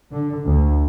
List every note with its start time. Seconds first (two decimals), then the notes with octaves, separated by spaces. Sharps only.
0.11 D3
0.45 D2